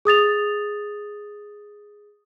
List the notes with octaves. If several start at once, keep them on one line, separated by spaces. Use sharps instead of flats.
G#4 D#6 A6 F7